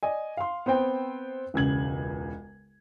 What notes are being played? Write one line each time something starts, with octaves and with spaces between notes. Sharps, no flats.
D5 D#5 G#5
F5 C6
B3 C4 C5 G5
E1 C#2 C#3 G#6 F#7